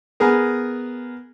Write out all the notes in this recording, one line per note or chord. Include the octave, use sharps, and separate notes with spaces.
B3 G#4 A#4